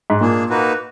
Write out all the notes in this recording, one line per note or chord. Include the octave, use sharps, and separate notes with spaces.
G#2
A#2 A#3 D4 G#4
A#3 D#4 F#4 B4